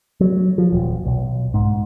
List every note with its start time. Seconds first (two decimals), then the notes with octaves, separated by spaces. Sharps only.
0.20 F#3
0.58 F3
0.72 D#1
1.05 B1
1.54 G#2